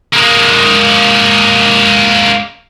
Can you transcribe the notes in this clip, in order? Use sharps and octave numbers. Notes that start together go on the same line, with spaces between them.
G#3 A#3